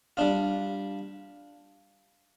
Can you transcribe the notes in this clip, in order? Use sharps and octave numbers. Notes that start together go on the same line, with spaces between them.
G3 D4 F4